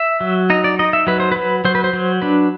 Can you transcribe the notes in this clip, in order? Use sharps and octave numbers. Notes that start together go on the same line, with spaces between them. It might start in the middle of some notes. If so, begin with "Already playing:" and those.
Already playing: E5
F#3
D#4 D#5
D5
D#4 D#5
E5
F#3 B4
C5
F#3 B4
F#3 C5
B4
C5
F#3
D4 B4